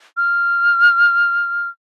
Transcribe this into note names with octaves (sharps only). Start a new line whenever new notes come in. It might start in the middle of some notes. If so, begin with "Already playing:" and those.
F6